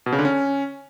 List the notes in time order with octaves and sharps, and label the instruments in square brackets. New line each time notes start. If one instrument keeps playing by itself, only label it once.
[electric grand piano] B2
C#3
D3
C#4